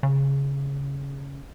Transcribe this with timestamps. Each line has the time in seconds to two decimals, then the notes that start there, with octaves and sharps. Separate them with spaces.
0.03 C#3